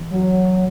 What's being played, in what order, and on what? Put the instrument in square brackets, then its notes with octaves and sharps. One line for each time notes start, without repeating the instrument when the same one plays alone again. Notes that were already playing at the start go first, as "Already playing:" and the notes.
Already playing: [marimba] E3
[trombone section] F#3